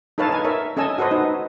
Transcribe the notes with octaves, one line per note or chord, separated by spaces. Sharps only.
D#4 A4 B4 C#5 F5 A5
D#4 G#5
A#4 C#5 E5
C#4 A4 D#5 G#5 E6
F#4 A4 B4 C5 D#5
D#4